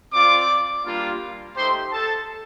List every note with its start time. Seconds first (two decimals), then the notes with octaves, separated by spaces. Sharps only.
0.13 C4 F4 D5 D6
0.85 G3 A#3 D4 F4
1.57 A3 D#4 G4 C5 C6
1.92 A4 A5